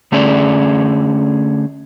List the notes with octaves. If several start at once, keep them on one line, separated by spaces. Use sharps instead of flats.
D3 A3 C#4 G#4 D5